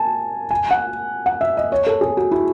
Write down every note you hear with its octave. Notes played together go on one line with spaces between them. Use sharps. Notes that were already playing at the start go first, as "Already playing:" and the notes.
Already playing: G#5 A5
G#5
F#5
F#5
E5
D#5
C#5
A4
G#4
F#4
E4